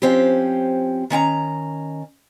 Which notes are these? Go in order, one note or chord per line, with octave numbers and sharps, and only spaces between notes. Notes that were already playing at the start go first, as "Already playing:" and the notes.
F3 C4 C#4 G4
D#3 C#4 G5 A#5